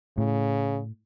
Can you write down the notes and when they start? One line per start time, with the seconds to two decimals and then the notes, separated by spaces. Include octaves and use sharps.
0.18 A2 C#3